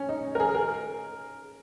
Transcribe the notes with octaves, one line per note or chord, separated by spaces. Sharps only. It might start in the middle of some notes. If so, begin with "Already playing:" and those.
Already playing: C#4
D#4
A#4
G#4
A#4